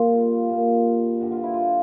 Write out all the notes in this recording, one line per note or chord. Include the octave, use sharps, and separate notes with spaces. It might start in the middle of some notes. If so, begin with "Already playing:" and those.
Already playing: A#2 G3 A#3 F4
A#2 G3 A#3
G2 D3 G3 F#4
F4
E4
F4